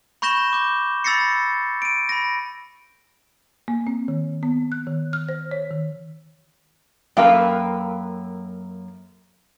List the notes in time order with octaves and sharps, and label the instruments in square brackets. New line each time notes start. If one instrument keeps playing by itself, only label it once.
[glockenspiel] B5 C#6 G6 A#6 E7 G7
D6 G6
B5 E6 A6 A#6 C7 C#7
D7 D#7
B5 A#6
[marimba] A#3
C4
D#3
B3
F#6
D#3
F6
C5
C#5
D#3
[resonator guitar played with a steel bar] F#2 A#3 B4 [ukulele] A4 F5 G5